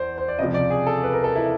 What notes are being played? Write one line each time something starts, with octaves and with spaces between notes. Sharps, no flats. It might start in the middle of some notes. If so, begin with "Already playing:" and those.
Already playing: E2 C5 D5
C5
D5
C#2 C3 F3 D#5
D5
G#4
A4
B4
A#4
A4
E4